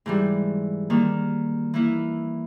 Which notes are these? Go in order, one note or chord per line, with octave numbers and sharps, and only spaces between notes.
G#2 E3 G3
D#3 G3 A#3
E3 A#3 E4